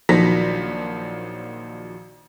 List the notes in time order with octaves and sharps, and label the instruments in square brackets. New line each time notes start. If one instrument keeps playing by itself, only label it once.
[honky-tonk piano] A#1 D#3 F3 F#3 A#6 B6